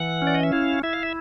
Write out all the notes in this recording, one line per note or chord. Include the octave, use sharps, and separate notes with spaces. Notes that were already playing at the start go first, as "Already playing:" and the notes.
Already playing: E3 F#5
C#4
D5
D#5
E5
E4 F5
E4 E5
F5
E5